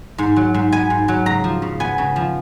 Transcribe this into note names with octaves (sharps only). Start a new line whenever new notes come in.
G#2
F#3
G#2
B3 G#5
G#2
F#3
C#3 A#5
F3
C#3
B3 G#5
C#3
F3